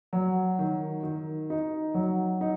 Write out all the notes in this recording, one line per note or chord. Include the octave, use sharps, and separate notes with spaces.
F#3
D#3
D#3
D#4
F#3
D#4